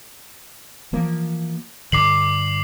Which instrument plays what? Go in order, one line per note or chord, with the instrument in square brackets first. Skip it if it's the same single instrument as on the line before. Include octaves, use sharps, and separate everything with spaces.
[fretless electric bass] E3 F3 A#3
[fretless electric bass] G2 D3 [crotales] D6 C7 F#7